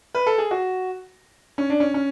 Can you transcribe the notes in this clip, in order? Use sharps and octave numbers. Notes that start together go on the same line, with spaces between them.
B4
A4
G#4
F#4
C#4
D4
C#4
C#4